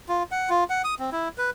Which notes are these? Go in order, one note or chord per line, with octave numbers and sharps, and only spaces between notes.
F4
F#5
F4
F#5
D#6
C4
E4
B4